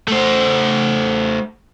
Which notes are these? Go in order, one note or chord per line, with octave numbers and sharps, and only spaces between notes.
A3 C5